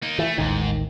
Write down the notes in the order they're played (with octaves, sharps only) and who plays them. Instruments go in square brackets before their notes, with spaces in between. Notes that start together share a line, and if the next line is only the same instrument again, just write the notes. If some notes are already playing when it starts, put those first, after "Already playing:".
[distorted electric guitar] A#3 D#4
[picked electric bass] E3 [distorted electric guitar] A3
[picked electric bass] A1 D#2 D#3 [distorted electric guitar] G#2